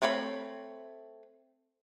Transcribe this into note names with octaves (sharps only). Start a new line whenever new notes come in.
A3 C4 C#5 D5 B5